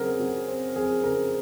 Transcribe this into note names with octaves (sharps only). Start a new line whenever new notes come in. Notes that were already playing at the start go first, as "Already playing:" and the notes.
Already playing: C#3 F#3 C4 G#4 A#4
F#3
C4
F2 G#4
C#3 A#4